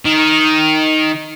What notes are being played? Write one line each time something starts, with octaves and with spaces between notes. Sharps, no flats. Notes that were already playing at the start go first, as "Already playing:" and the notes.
D#3